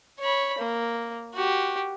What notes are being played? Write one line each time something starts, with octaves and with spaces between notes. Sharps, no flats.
C#5 B5
A#3
F#4 G4